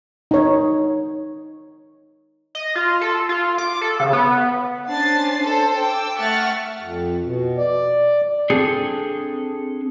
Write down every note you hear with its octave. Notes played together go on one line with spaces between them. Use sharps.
D#4 C#5
D#5
F4
A4
F4
D6
A4
C#3
B3
C#4 D4 C5 A6 C7
A4 C5
G5 D6 E6
A3 E5 F#5 C#6 F6 A6
F2
B2
D5
C4 D4 G#4 A4